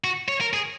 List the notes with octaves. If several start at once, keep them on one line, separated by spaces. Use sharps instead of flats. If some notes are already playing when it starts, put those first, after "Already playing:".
F#4
C#5
A#4
G#4